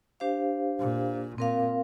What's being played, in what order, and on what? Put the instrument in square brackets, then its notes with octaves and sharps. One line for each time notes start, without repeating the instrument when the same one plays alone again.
[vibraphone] D4 G4 C5 F5
[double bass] A#2
[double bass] A#2 [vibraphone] C4 A#4 F5